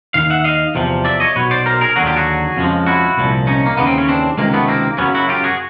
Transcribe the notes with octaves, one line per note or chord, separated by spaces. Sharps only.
D#2 D#3 F5
E5 F#5
D#5 F5
E2 C3 F3
D5 E5
C#5 D#5
B1 B2 F#3 B4 C#5
C5 D5
A#4 C5
G#4 A#4
D#2 D3 F#3 F#4 G#4
F4 G4
F#4 G#4
F2 C#3 F3 G#3
E4 F#4
C2 A#2 F3
C#4 D#4
A#3
D#2 C#3 E3 B3
C4
C#4
C4 D4
C#2 C3 D#3 G#3 A#3
A3 B3
A#3 C4
F#2 C#3 F#3 B3 C#4
E4 F#4
F4 G4
F#4 G#4